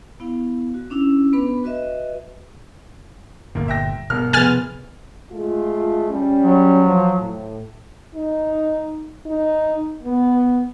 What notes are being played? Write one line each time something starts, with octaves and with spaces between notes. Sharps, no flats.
B3 E4 F5
F#4
C#4 D4 E4 E6
B3 D4 B4 B5
F#4 B4 D#5 E5
G1 A#2 D3 A#3
E5 G5 A#6
G1 B2 A#4 F6
E1 C3 F3 B3 G#5 F6 A6
G#3 A3 F4
G3 C#4
F#3
F3
A2
D#4
D#4
B3